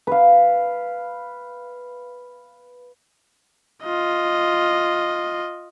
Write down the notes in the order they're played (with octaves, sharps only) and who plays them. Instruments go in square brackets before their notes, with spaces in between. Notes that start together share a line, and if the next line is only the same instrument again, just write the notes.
[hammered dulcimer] B4 F5
[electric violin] F4 D#5